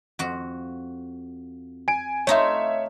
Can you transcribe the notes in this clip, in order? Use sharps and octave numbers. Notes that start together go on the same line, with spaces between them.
F2 F#4
G#5 D7
A3 D#4 F4 C#5 E5